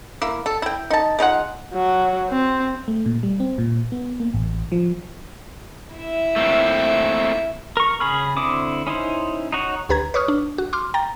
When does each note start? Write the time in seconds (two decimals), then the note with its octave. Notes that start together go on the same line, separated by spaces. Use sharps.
0.22 A#3 E4
0.46 A4
0.62 E4 G5
0.90 D#4 A5
1.19 G#3 D#4 F4 F#5
1.74 F#3
2.30 C4
2.88 A3
3.06 A#2
3.23 G3
3.40 C4
3.58 A#2
3.92 B3
4.20 A#3
4.33 A1
4.72 F3
5.95 E4 E5
6.36 A3 A#3 C4
7.77 A#4 C#6
8.00 C#3 G#4 B5 F6
8.37 D3 C4 E4 D6 D#6
8.87 C#4 D#4 E4 C5
9.52 D#4 F#4 C#5
9.89 D2 G4 B4 A#5 G#6
10.14 B4 C#5 C#6 D#6 F6
10.28 D4
10.58 F#4
10.73 C6 D6 F6
10.94 G5 A#5 A6